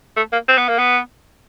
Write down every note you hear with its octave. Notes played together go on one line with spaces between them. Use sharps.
A3
A#3
C4
B3
A#3
B3